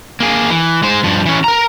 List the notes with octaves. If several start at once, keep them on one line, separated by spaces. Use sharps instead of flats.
A#3 G#4
E3
G#3 C5
G2 F3
E3 C#4
A#4 A#5